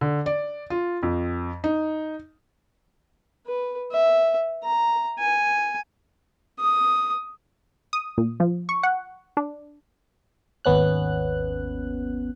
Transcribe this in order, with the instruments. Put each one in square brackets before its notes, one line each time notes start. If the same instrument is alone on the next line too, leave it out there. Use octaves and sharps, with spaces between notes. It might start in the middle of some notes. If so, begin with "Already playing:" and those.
[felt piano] D3
D5
F4
F2
D#4
[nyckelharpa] B4
E5
A#5
G#5
D#6
[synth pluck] D#6
A#2
F3
C#6
F#5
D4
[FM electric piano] G#1 D#2 B3 C#4 F#6